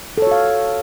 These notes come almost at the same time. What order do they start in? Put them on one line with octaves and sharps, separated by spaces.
A4 C#5 F#4 F5